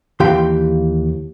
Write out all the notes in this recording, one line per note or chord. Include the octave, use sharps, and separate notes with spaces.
D#2 E3 G4 F5 G5 C6